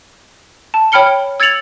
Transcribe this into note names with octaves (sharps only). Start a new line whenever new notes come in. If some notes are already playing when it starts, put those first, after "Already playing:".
A5
C#5 G5 B5 F6 C#7 G7
E6 G#6 A6 C#7 F7 F#7